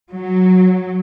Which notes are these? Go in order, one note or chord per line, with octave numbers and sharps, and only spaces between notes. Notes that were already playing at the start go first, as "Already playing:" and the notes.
F#3